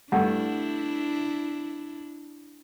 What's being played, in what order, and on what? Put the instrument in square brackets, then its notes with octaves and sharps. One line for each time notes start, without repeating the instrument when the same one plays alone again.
[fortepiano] G2 A3 [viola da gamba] D4 E4 [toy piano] F#5